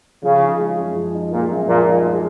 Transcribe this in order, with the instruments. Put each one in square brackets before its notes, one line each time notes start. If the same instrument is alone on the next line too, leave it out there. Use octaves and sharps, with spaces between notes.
[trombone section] C#3 [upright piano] F3
[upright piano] D#4
G#3
F#2
F3
D#4
[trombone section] A#2 [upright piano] G#3
[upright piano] F#2
[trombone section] A#2 [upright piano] F3
[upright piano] D#4
G#3